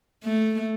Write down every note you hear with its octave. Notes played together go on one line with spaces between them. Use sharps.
A3